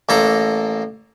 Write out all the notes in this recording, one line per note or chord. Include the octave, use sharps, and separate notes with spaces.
A1 A#3 A4 A#5